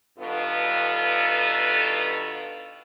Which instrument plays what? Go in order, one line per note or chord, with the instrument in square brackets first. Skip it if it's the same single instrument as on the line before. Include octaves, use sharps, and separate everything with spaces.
[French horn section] G2 B2 D#3 B3 F4 A4